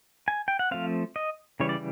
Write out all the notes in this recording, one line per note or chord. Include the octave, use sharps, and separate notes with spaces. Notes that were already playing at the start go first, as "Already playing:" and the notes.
G#5
G5
F#5
F3 A3 C4 F5
D#5
C#3 E3 G3 C#5
D5